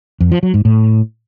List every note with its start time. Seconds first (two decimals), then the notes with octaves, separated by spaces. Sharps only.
0.20 F2
0.32 F3
0.43 F#3
0.54 G#2
0.65 A2